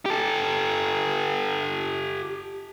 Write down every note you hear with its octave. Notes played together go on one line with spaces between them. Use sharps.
G4 A4